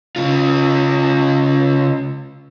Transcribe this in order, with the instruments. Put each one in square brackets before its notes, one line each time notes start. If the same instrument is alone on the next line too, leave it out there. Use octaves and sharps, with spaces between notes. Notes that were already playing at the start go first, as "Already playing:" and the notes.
[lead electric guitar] C#3 F4